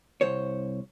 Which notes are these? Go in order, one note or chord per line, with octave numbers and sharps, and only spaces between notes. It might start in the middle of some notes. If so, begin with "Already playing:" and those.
C2 C5 C#5